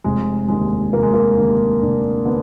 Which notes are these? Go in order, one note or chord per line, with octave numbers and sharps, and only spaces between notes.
F1 G#3
D#2 D3 G#3
F1 A#3
G#3
A#3
D#2 D3
F1 D4
D3 B3